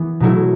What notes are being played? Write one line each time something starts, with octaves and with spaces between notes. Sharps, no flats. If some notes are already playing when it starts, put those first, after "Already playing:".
Already playing: E3 B3
B2 F#3 A3 E4